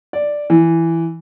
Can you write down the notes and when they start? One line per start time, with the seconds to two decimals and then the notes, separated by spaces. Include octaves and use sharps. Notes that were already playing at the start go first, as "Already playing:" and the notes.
0.13 D5
0.50 E3